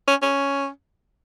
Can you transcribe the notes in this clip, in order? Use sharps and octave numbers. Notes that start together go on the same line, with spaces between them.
C#4
C#4